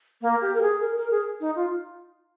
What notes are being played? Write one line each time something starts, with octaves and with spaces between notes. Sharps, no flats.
A#3
G4
A#4
G#4
A#4
A#4
G#4
D#4
F4